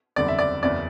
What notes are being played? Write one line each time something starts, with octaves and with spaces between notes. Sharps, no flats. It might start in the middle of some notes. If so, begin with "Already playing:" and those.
F#1 E2 D3 G3 D5
E5
D5
F#1 E2 C#3 D5